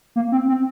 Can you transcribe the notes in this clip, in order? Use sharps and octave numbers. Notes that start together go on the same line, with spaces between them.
A#3
C4
C4